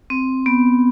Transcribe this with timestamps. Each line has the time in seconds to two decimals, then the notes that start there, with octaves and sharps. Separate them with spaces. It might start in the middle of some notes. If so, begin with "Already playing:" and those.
0.10 C4
0.46 B3